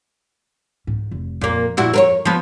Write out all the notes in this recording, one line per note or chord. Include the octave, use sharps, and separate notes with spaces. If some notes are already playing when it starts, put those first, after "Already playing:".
G#2
F1
F2 A#2 A#3
A#2 E4 F#4
A#4 B4 C#5
F3 B3